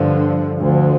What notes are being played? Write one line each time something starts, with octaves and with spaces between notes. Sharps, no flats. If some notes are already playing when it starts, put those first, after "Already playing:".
Already playing: G2 D3 F3
D2 D3 F3